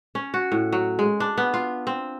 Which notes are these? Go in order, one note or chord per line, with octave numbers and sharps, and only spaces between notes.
C#4
F#4
A2
F#3
G#3
D4
B3
F4
C4